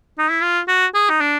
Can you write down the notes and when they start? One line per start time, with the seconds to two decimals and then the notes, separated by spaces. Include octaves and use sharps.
0.18 D#4
0.30 E4
0.42 F4
0.68 F#4
0.95 G#4
1.10 D#4
1.21 D4